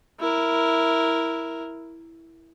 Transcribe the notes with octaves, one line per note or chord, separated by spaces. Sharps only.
E4 A#4